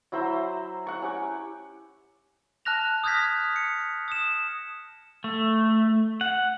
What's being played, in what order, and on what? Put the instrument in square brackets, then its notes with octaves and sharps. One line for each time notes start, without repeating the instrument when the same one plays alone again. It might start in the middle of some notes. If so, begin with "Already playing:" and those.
[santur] F#3 E4 C5 B5
F#5 C#6
C#4 G4
[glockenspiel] A5 F6 F#6 A#6 F7
D#6 F6 G6 G#6 A#6 B6
C#7
D#6 E7
[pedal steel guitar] A3
F#5